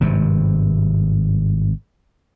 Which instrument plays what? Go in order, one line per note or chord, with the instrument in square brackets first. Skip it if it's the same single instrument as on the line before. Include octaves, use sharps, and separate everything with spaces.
[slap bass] G#1 G2 C3